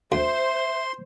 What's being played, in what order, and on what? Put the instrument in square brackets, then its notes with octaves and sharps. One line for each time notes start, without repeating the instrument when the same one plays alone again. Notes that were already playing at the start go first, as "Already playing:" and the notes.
[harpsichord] D2 [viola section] C5 [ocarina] E5 [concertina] C6